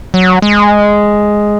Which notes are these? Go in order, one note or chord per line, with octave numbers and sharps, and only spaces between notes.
F#3
G#3